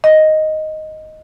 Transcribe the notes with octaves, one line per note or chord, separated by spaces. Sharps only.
D#5